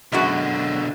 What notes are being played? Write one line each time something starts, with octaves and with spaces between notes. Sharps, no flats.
F#2 B2 D3 G#3 F#4